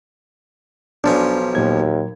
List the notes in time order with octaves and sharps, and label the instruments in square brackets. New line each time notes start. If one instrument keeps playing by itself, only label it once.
[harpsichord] B1 F3 C#4 [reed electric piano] D4 A5
[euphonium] D#2 [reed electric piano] A#2 F#3 G#6